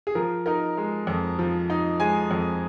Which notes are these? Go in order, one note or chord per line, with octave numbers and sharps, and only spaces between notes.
G#4
F3 A#4
D#4 A#4
G#3
F2
F3
D#4
G#3 G#5
F2